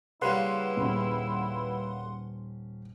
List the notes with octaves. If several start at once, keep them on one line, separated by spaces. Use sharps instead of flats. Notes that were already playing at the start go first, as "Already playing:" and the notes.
C#3 G3 A#3 E4 B4 F#5 C6
D#1 C#4